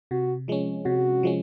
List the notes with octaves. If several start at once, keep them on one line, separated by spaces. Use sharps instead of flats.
C3 F#4
F3 G#3 C#4
C3 F#4
F3 G#3 C#4